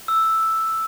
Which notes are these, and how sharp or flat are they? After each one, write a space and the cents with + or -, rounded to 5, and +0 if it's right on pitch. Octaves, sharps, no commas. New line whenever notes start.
E6 +0